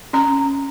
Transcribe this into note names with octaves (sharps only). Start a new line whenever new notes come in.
C#4 A#5